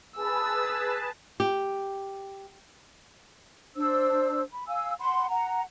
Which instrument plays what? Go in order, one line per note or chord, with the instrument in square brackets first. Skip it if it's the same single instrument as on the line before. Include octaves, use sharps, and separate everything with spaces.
[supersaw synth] G#4 B4 A5 [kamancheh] E6
[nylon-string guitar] G4
[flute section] D4 C5 E6
B5
F5 G#5 E6
F#5 B5 C6
F#5 A#5